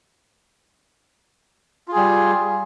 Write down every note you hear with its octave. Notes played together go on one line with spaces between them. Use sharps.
G3 F4 G#4